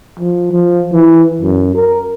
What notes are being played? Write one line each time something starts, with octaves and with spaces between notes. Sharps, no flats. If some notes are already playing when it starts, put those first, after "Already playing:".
F3
F3
E3
F#2
A#4